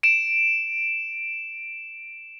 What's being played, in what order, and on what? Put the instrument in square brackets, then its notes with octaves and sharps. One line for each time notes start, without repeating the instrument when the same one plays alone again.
[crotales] D7 E7